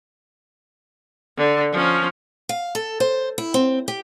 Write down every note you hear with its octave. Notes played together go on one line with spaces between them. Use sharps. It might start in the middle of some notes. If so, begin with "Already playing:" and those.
D3
F3 C#4
F5
A4
C5
E4
C4
G4